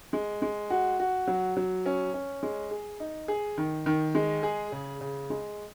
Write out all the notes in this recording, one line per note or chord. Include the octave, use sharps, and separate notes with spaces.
G#3
G#3
F#4
F#4
F#3
F#3
C#4
C#4
G#3
G#4
D#4
G#4
D#3
D#3
G#3
G#4
C#3
C#3
G#3